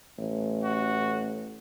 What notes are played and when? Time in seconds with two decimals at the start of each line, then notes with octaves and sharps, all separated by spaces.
0.18 A1
0.63 F#4